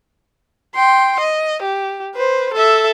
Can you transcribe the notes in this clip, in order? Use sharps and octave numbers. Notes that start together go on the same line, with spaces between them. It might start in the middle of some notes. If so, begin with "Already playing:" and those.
G5 C6
D#5
G4
B4 C5
A4 E5